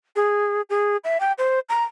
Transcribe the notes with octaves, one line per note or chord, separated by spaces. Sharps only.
G#4
G#4
E5
G5
C5
A#5